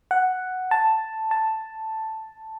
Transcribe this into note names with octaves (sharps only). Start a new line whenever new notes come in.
F#5
A5
A5